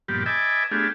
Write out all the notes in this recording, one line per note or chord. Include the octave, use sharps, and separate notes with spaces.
G2 A#2 F3 B3 G4
B4 D#5 E5 G#5 A5 D6
A3 B3 D4 F4 G4 G#4